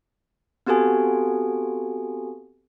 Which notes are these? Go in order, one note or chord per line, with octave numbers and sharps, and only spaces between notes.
B3 C4 F#4 G4 A4 G#5